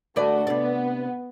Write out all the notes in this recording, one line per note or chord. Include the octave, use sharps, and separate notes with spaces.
D2 A3 F#4 A4 B4 D5
C3 B3 D5